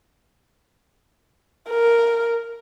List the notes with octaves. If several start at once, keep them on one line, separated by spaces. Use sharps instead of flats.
A#4